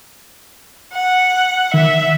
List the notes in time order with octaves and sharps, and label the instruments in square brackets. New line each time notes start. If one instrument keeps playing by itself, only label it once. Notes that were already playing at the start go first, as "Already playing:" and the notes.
[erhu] F#5
[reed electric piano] D#3 [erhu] E5